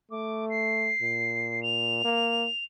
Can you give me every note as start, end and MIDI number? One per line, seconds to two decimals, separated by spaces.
0.11 0.91 57
0.11 0.46 86
0.50 1.63 96
1.02 2.02 46
1.63 2.64 101
2.04 2.47 58